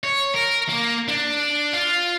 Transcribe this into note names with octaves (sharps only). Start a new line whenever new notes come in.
C#5
A#4
A#3
D4
F4